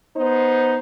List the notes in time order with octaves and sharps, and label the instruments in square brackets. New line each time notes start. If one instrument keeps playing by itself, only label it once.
[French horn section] B3 D#4 C5